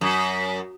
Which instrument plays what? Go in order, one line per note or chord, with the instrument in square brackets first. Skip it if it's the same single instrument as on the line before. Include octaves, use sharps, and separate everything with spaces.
[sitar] F#2